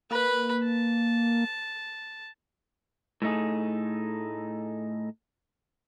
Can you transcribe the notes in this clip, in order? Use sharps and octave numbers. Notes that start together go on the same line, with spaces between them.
A#3 B4 B5
A5
A2 A3 D#4 G#4